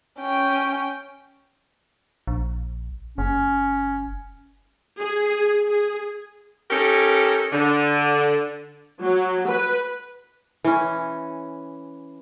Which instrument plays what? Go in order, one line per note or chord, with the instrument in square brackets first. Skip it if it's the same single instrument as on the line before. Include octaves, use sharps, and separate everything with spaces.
[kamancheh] C#4 G5
[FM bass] A#1
[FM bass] F#1 [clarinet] C#4
[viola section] G#4
G#4
[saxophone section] C#4 D#4 G4 A4 A#4
D3
[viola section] F#3
B4
[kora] E3 C#4